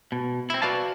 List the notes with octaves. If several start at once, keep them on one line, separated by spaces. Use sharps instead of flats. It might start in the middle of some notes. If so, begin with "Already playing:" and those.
B2
C4 E4
F#4 B4 D5 F5 A5